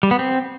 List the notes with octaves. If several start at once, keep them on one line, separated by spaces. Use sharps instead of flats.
G3
B3
C4